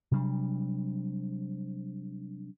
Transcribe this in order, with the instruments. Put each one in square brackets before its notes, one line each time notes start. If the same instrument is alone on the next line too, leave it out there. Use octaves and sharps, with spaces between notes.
[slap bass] C3 F#3 G3 D4